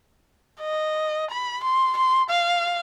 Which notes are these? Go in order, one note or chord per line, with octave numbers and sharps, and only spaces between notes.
D#5
B5
C6
C6
F5